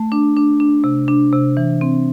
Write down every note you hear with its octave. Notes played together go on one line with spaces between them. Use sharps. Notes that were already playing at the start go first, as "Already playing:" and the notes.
Already playing: A3
D4
D4
D4
C3
D4
C3
E3
C4